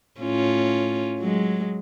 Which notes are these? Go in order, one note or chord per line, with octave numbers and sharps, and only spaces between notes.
A2 C#4 F4
F#3 G#3